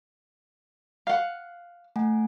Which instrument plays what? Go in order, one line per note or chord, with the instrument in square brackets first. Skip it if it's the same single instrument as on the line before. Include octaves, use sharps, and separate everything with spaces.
[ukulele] F5 F#5
[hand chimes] A3 F#5 G#5